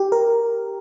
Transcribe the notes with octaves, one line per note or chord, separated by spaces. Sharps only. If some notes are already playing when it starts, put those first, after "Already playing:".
Already playing: G4
A#4